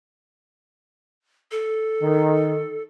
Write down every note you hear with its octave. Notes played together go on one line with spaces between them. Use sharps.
A4
D#3